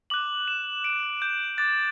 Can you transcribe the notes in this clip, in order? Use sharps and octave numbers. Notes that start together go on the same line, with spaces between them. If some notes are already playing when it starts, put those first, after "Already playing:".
D6 F#6 F#7
E7
D7
G6
D6 F#6 A6